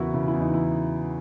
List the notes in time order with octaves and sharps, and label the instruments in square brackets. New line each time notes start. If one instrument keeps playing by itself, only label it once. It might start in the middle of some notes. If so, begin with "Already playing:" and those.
Already playing: [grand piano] E2 C#3 E3 B3 E4 F#4 A#4 B4
C#3 E4
E4
E2
D#4
E3 E4